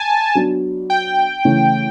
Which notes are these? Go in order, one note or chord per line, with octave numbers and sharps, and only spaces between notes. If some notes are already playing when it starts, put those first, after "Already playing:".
Already playing: G#5 A5
F#3 B3 D4
G5
C#3 E3 A3 C#4